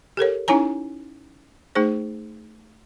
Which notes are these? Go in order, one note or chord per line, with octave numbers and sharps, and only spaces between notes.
G4 A4 A#4 C#5
C#4 D#4 E4 C#5 G#5 A#5
A3 D#4 G#4 C5